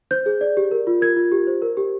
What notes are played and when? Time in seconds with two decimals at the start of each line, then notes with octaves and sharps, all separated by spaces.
0.11 C5 G6
0.26 G#4
0.41 D5
0.57 G4
0.71 A#4
0.87 F4
1.01 A#4 G#6
1.16 F4
1.32 G4
1.47 C5
1.62 A#4
1.77 G4